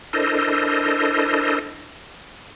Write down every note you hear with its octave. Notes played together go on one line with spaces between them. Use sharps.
D4 E4 A4 A#4 C5 D#5